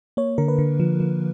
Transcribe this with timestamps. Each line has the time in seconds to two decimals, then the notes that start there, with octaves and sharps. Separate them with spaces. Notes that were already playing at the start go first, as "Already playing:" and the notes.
0.17 A#3 C#5
0.38 D3 A#4
0.48 B4
0.58 D3
0.80 F3
1.00 F3